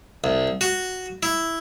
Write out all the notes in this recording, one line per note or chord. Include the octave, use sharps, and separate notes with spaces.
C2
F#4
E4